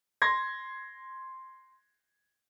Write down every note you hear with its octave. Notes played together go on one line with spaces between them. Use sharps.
C6 G#6 A#6